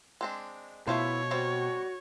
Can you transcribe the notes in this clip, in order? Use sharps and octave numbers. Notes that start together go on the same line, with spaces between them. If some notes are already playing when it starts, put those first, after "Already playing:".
G#3 C4 D4
B2 A3 E4 F4 C5 C#5
G3 C4 F#4